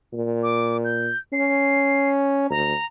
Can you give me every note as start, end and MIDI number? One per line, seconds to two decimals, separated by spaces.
0.14 1.10 46
0.43 0.77 86
0.85 1.18 91
1.33 2.49 61
1.33 2.09 96
2.50 2.74 38
2.50 2.85 82